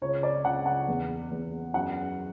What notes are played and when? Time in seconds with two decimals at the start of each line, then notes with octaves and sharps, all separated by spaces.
0.02 C#2 C#5
0.23 D5
0.45 C#2 F#5
0.66 F#5
0.88 E2
1.31 E2
1.74 F#2 F#5